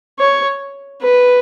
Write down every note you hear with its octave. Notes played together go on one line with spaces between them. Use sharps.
C#5
B4